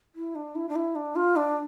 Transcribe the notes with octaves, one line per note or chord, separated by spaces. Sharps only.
E4
D4
E4
D4
E4
D4
F4
D4